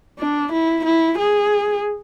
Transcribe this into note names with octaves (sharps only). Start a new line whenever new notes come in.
D4
E4
E4
G#4